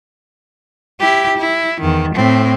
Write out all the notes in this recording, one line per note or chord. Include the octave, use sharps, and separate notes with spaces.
E4 G4
E4
E2 D#3
A2 C4